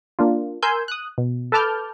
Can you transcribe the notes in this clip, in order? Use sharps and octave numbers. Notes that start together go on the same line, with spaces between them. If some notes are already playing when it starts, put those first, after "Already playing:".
A#3 D4 F4
A#4 G#5 C6 E6 G6
D#6 F#6
B2
A4 B4 A5 D6 F6 G6